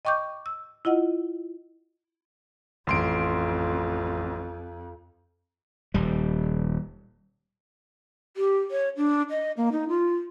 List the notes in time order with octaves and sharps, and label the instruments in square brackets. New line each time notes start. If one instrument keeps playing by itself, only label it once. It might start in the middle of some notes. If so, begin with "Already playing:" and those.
[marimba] D#5 G5 C#6 D6 G6
E6
E4 F4 D#5 F#5
[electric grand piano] A1 C6 D7 [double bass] F2
[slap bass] D#1 G3
[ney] G4
C#5
D4
D#5
A#3
D#4
F4